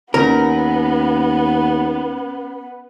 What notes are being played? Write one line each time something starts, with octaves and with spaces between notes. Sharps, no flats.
D#2 B3 C#4 A#4 A#6